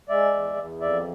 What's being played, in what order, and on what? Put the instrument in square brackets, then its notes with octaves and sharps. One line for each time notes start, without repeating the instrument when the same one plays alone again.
[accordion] G#3 D5 E5
E2
E2
F2 D5 E5